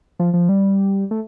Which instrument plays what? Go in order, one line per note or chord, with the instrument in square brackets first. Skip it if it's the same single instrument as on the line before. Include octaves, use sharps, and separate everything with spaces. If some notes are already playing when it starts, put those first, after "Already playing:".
[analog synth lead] F3
F3
G3
A3